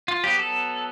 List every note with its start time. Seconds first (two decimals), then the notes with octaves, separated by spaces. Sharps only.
0.08 F4
0.24 F#3 B3 G4
0.39 A4